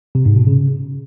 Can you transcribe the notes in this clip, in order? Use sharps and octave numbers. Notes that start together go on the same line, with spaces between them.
C3
G#2
B2
C#3